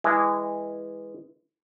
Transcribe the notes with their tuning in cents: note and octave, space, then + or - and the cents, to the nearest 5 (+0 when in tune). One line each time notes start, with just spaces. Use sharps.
E3 +0 G#3 -20 E4 +0